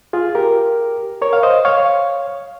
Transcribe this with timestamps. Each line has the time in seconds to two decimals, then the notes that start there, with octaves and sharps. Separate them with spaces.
0.13 F4 G#4
0.35 G4 A#4
1.22 A#4 C#5
1.33 F5
1.43 C5 D#5
1.65 C#5 F5